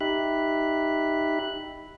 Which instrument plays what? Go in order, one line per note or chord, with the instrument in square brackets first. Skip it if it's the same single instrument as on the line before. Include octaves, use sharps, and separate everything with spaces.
[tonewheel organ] D#4 G4 E5 B5 F#6